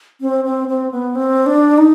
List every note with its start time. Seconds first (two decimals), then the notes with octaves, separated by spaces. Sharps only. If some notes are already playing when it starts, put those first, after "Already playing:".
0.21 C4
0.45 C4
0.68 C4
0.91 B3
1.15 C4
1.46 D4
1.78 D#4